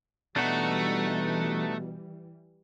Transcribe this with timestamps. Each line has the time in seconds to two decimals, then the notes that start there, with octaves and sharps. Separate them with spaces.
0.36 B2 E3 G3 A3 D4 D#4 F#4